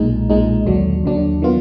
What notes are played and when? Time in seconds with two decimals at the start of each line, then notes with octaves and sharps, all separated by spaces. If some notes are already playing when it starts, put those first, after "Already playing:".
Already playing: B1 A#2 G#3 D#4
0.29 B1 A#2 G#3 D#4
0.66 D#2 D3 F#3 D4
1.04 D#2 D3 F#3 D4
1.42 D#3 F#3 B3 F4